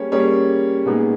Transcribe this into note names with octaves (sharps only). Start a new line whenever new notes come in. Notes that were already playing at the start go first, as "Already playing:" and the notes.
Already playing: G3 A#3 C#4 G#4 C#5
G3 A#3 C#4 G#4 C#5
A#2 G#3 B3 D#4 G#4